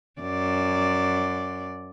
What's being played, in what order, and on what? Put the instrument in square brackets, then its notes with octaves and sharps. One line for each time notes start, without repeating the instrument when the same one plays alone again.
[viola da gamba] F#2 D5